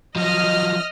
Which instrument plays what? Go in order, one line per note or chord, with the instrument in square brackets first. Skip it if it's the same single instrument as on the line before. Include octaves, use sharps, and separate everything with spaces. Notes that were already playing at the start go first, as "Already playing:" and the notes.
[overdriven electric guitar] F3 F#3 [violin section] D#5 F6